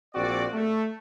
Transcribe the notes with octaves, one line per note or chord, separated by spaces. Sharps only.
A#1 C4 F#4 D5
A3